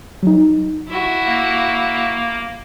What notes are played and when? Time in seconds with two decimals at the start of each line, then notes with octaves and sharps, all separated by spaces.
0.23 F#3 D#4
0.88 E4 F#4
1.26 A#3